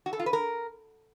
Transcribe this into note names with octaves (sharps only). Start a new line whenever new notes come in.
F#4
A4
F4
B4
A#4